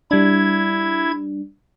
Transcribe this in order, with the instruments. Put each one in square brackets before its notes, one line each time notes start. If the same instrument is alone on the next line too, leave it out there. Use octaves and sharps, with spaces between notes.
[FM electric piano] G3 D4 [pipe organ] E4 G#6